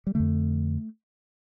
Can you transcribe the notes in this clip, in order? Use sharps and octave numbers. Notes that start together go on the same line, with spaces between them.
G3
F2 D3 A3